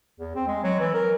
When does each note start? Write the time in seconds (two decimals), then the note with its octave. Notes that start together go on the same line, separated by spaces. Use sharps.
0.20 E2
0.35 C4
0.47 G#3
0.64 F#3
0.79 E3
0.94 A#4